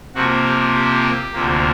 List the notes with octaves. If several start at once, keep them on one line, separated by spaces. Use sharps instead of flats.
C3 F3 A#3 F#4
G4
G4
D2 C3 F3 A#3